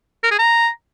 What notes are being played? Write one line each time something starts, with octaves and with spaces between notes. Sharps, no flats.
A#4
G#4
A#5